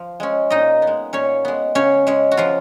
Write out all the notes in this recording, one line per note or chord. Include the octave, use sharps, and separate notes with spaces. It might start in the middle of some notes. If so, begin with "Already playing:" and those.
Already playing: F3
G#3 C#4
A#2 D#4 D#5
B3
G#3
A#2 C#4 C#5
G#3 B3
C#3 C#4 C#5
G#3 C#4
F#4
C#3 F3 F4